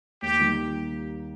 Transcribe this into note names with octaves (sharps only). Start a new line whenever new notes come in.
D#2 G4
D#3 G3